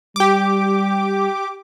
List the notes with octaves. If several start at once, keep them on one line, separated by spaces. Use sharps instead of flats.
G3 G4 D6